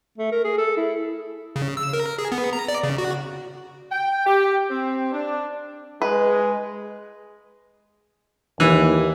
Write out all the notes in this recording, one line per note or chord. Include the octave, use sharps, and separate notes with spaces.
A3
A#4
G#4
A4
E4
C#3
E6
A#4
G#4
B3
A#5
D5
C#3
F#4
G5
G4
C4
D4
G#3 B4
D#2 E3